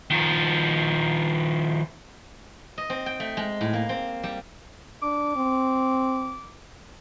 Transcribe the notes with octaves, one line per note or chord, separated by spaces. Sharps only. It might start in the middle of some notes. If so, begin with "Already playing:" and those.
D#3 F3
D#5
C4
G5
A3
G#3
A2
A#3
C4
G3
D4 D6
C4